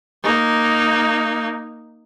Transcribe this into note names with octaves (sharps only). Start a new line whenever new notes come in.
A#3 D#4